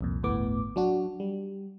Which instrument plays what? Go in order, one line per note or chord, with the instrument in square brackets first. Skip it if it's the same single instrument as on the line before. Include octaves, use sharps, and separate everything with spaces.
[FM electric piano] C2 F2 A#2
G1 D2 A2 B3 D6
F#3 D4 F#4
G3